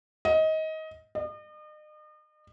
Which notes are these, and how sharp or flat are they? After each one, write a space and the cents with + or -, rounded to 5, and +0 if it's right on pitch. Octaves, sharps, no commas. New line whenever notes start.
D#5 +20
D#5 -40